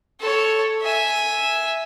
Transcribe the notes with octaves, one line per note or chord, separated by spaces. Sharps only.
A4 C#5
E5 G#5